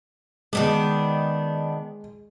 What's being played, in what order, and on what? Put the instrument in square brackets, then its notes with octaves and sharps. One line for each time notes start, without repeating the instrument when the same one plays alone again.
[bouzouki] D#3 B3 D4 [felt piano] G#3